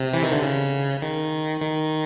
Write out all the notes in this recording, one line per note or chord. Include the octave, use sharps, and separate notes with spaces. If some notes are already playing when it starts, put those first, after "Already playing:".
Already playing: C3
E3
D#3
D3
C#3
D#3
D#3